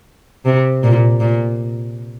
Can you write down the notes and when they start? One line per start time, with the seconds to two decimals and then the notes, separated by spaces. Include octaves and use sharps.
0.45 C3
0.83 A#2
1.20 A#2